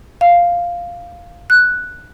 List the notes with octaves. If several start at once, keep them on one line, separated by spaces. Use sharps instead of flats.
F5
F#6